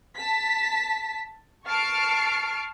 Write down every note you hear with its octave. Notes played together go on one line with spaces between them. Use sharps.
A5 B6
A5 C#6 F6 C7 D7